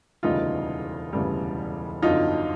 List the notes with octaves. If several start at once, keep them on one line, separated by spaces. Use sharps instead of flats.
E1 D2 C#3 E3 G3 D#4 F4
E1 D2 C#3 E3 G3
G1 F2 D3 F#3 D#4 F4